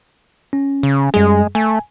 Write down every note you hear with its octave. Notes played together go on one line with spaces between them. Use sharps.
C#4
C#3
F#2 G3 G#3 G#4
A3 G#5